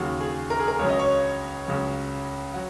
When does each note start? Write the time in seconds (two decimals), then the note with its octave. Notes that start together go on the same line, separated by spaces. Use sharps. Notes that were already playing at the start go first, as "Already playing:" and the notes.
Already playing: D#2 C#3 F#3 F#4
0.21 G#4
0.50 A#4
0.60 G#4
0.68 A#4
0.79 C#2 C#3 F#3 C#5
0.89 D#5
0.99 C#5
1.67 C#2 C#3 F#3
2.54 F#3 F#5